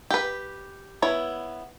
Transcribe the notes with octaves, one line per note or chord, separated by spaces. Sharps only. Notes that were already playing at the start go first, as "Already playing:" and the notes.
G4 B4
B3 E4 C#5